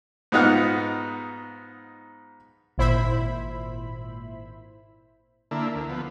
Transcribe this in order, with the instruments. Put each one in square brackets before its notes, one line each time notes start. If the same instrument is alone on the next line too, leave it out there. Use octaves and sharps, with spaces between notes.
[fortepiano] G#2 B3 D#4 F4 F#5 F6
[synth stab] G#1 A#2 E4 C5 E5 B5
[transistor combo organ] D3 A#3 E4
D2
F3 B3